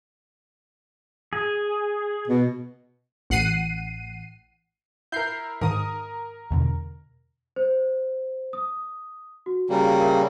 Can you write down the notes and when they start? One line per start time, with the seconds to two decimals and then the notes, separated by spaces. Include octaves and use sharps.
1.33 G#4
2.28 B2
3.30 A1 F#5 C7 D#7
5.12 E4 A#4 G6 C7
5.61 G#2 D#3 A#4 D#6
6.51 E2 B2 D3
7.56 C5
8.53 D#6
9.46 F#4
9.70 C#3 G3 A#3
10.01 A#4 E5